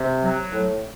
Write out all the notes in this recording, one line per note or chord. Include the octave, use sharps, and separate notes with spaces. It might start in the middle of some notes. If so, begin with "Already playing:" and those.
Already playing: C3
F#3
A2